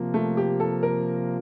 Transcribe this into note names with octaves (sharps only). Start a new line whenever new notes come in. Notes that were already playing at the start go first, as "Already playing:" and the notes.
Already playing: C3 F3 A#3
A3
G4
A4
A#4